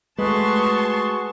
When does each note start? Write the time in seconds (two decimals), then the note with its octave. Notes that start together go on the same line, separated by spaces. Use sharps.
0.18 G#3 A3 F#4 G#4 B4 A5 C6 C#6